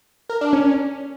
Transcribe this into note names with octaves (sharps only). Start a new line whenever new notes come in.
A#4
D4
C#4